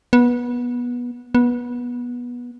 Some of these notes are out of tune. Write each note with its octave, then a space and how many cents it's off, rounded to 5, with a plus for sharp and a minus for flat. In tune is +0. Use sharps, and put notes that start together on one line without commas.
B3 -20
B3 -20